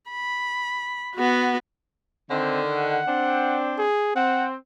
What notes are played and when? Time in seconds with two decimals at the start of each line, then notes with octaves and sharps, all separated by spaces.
0.11 B5
1.15 B3 F#4
2.30 D3 D#3 C4
2.70 F#5
3.07 C4 D4
3.78 G#4
4.16 C4 F#5